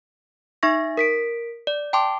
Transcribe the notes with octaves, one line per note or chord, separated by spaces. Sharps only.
D#4 E5 C#6 A#6
A#4 B6 D7
D5
G5 A5 C6 D6